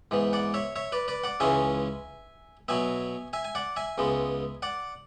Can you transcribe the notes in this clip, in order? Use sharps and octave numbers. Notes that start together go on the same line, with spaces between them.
G#2 E3 B3
D5 F#5
C#5 E5
C#5 E5
B4 D5
B4 D5
D5 F#5
C#2 C#3 E3 G#3 C#4 E5 G#5
B2 F#3 B3 E5 G#5
E5 G#5
G#5
D5 F#5
E5 G#5
C#2 C#3 G#3 B3
D5 F#5